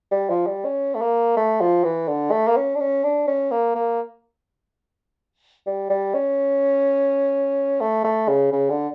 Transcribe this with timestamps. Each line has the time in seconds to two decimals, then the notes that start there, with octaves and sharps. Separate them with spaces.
0.11 G3
0.30 F3
0.47 G3
0.65 C#4
0.95 A3
1.01 A#3
1.37 A3
1.61 F3
1.84 E3
2.09 D3
2.32 A3
2.48 A#3
2.57 C#4
2.75 D4
2.81 C#4
3.04 D4
3.28 C#4
3.51 A#3
3.75 A#3
5.67 G3
5.90 G3
6.14 C#4
7.81 A3
8.05 A3
8.28 C#3
8.52 C#3
8.70 D3